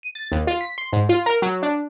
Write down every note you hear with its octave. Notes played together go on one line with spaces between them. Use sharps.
D#7
A6
D#2
F4
B6
C6
G#2
F4
A#4
F#3
D4